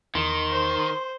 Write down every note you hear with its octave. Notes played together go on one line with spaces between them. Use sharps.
E2 D#3 C6
C5